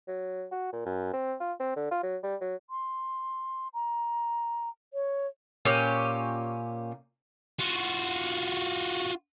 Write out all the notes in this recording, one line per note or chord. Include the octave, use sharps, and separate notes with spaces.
F#3
F#4
A#2
F#2
C4
F4
C4
D3
F4
F#3
G3
F#3
C6
A#5
C#5
A#2 C#4 G4
F4 F#4